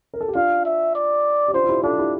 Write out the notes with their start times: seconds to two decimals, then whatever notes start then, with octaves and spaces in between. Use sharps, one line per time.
0.14 A#4
0.21 A4
0.28 G4
0.35 D4 F4 F5
0.65 E5
0.95 D5
1.48 G4
1.54 D4 F4 C5
1.64 F4
1.69 E4 G4
1.83 D4 F4 A4
1.98 E4 G4